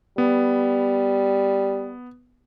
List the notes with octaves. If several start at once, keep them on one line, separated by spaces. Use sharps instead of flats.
G3 B3